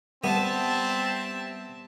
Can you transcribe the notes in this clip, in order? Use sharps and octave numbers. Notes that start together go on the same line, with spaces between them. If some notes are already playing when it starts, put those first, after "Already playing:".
G3 B3 C4 E5 A5